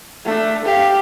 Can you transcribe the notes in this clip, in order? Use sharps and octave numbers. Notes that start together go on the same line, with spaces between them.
A3 D4
G4 F5